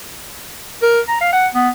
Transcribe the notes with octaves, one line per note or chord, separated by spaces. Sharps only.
A#4
A#5
F5
F#5
B3